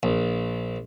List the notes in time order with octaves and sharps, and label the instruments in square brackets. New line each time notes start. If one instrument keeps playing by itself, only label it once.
[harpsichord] A#1